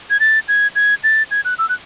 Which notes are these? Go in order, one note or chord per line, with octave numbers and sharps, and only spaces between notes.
G#6
A6
G#6
G#6
A6
G#6
F#6
E6
F#6